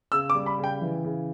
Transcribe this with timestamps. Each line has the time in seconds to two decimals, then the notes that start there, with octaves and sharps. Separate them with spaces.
0.12 C#3 E6
0.30 D6
0.35 G3
0.46 B5
0.58 C#3
0.64 G5
0.81 E3
1.04 C#3